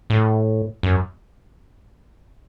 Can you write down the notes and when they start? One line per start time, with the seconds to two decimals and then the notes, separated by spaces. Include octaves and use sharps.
0.10 A2
0.83 F#2